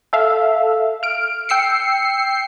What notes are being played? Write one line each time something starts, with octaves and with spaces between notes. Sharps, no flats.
A4 E5 F5
F6 D7
G5 E6 C7 C#7